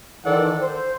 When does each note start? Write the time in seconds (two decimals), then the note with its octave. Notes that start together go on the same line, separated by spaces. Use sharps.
0.25 D#3 E3 A4 D5 F#5
0.60 C5